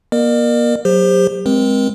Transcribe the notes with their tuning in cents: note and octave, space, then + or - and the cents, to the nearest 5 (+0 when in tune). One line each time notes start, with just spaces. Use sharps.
A#3 +40 A#4 +0 D5 +45
F#3 +0 G4 +35 C5 +0
G#3 +0 C4 +0 A#4 +35